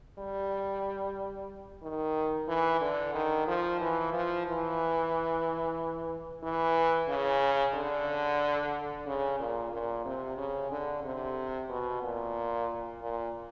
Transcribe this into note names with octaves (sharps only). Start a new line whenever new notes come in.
G3
D#3
E3
D3
D#3
F3
E3
F3
E3
E3
C#3
D3
C#3
A#2
A#2
C3
C#3
D3
C3
B2
A#2
A#2